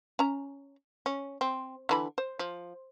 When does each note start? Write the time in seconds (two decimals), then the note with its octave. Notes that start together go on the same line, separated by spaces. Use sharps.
0.19 C#4 A#5
1.06 C#4
1.41 C4
1.89 D3 E3 B5
2.18 C5
2.39 F3